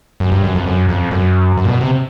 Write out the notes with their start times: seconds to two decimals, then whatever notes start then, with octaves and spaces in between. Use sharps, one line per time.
0.20 F#2
0.32 G2
0.44 F#2
0.55 F2
0.66 F#2
0.89 F2
1.11 F#2
1.57 F#2
1.65 A#2
1.69 B2
1.81 C3